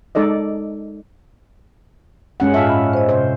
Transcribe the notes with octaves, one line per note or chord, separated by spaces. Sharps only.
G#3 D#4 A4 D5 D#5
G2 G#3 C#4 F#5
A2 F4 E5 F5 A5
B5
C5 D#5
C3 C5